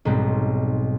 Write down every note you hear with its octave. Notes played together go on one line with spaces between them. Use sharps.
B1 G#2 G3 C4